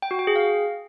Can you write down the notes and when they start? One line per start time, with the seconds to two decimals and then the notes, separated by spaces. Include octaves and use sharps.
0.02 G5
0.11 F#4
0.19 G5
0.27 G#4
0.36 F5